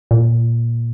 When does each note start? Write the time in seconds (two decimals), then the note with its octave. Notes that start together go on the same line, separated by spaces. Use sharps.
0.11 A#2